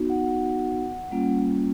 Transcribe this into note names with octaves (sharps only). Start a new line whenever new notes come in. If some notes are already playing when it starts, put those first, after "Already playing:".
Already playing: B3 D#4 F#4
F#5
G3 A#3 C#4 F4